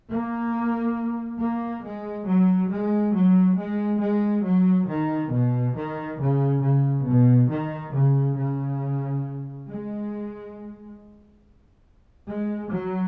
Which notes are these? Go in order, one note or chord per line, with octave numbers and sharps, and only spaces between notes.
A#3
A#3
G#3
F#3
G#3
F#3
G#3
G#3
F#3
D#3
B2
D#3
C#3
C#3
B2
D#3
C#3
C#3
G#3
G#3
F#3